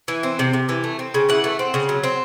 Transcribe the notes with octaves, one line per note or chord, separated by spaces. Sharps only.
E3
C4
C3
C3
E3
A3
C4
C#3
E3 F#5
A3
C4
C#3
F#3
C4